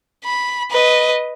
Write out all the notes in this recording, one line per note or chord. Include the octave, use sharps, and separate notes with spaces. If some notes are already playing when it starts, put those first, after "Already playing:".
B5
B4 D#5